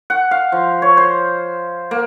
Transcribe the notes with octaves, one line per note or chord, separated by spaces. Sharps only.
F#5
F5
F3
C#5
C5
A#3